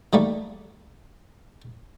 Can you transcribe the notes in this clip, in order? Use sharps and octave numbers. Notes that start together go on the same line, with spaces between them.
D#3 G3 A3 A#3